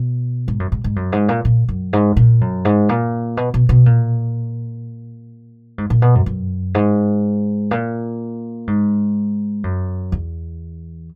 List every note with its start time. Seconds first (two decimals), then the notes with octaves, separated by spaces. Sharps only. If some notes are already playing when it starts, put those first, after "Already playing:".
Already playing: B2
0.48 G#2
0.60 F#2
0.72 G#2
0.84 G#2
0.96 F#2
1.12 G#2
1.29 A#2
1.45 A#2
1.68 F#2
1.93 G#2
2.17 A#2
2.41 F#2
2.65 G#2
2.89 A#2
3.37 B2
3.54 B2
3.69 B2
3.86 A#2
5.78 G#2
5.90 A#2
6.02 B2
6.15 F#2
6.26 F#2
6.75 G#2
7.71 A#2
8.67 G#2
9.64 F#2
10.12 E2